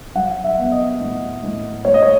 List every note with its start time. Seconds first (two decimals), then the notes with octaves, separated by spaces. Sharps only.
0.15 F#3 F#5
0.44 E5
0.58 B3
0.72 D#5
1.01 A2
1.43 A2
1.85 A3 C#5
1.94 D#5
2.02 C#5